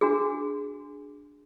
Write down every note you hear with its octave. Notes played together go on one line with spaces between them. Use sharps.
D4 F#4 G#4